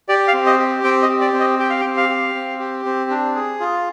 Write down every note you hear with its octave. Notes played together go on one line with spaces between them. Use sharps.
G4 D5
F5
C4
D#5
G4
C4 G5
D#5
G4
D5
C4
D#5
G4 G5
F5
G5
C4
F5
G4
C4
G4
C4
D4
G#4
F4